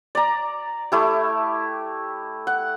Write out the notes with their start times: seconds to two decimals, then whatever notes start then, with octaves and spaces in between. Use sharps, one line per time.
0.15 D5 A#5
0.92 A3 E4 G4
2.47 F#5